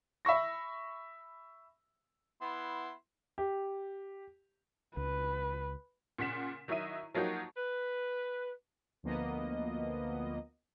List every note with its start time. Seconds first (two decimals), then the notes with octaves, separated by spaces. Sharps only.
0.25 E5 B5 C#6 A#6
2.41 B3 E4 C6
3.38 G4
4.97 C#2 B4
6.18 A#2 C#3 F#5 B6 E7
6.68 D#3 F#3 E4 D#5 E5 D#7
7.14 F3 F#3 A#3 D#4 F#4 G4
7.56 B4
9.03 D2 F3 A#3 B3 D#5